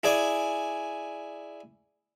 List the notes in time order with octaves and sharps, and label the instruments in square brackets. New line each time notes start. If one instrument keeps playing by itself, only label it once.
[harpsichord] E4 G#4 D5 G#5